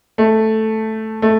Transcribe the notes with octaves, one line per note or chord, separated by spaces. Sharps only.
A3
A3